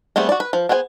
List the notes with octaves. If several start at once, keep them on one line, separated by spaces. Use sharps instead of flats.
G3 A3 B3 C4 G#4
F#4 D5
B4
F3
B3 G#4 C5 G5 G#5